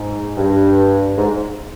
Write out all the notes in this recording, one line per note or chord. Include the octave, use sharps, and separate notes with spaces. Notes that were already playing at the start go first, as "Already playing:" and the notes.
Already playing: G#2
G2
G#2